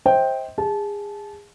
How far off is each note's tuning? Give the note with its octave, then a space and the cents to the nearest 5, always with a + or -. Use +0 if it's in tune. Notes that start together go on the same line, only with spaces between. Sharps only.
C5 +15 D#5 +40 G5 +0
G#4 -25 A5 -25